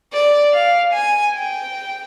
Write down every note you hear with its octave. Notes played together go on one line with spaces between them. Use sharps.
D5
F5
G#5
G5